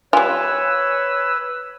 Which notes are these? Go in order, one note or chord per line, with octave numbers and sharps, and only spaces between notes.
G3 F4 B4 C#5 G#5 E6